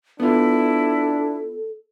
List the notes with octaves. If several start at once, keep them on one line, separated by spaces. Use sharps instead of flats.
B3 D4 E4 F4 A4